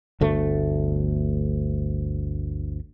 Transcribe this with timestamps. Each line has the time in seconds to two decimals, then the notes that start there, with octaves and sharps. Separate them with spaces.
0.21 G1 D2 A3